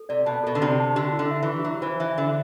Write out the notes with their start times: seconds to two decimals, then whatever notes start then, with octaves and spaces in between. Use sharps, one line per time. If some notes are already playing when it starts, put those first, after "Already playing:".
Already playing: A4
0.09 C3 D5
0.26 B2 A5
0.44 B2 A4
0.55 D3
0.62 C3 D5
0.79 A5
0.95 D3 G4
1.13 E4
1.19 D3
1.31 E5
1.43 E3 G4
1.65 F#3 G4
1.82 E3 C5
2.00 E3 E5
2.17 D3 E5